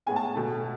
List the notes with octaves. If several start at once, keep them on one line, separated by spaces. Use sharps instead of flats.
A2 G#3 B3 G#5
A5
G#5
B2 A3